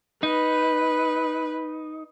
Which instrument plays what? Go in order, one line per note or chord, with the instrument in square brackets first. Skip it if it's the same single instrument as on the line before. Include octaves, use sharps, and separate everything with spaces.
[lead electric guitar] D#4 [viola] B4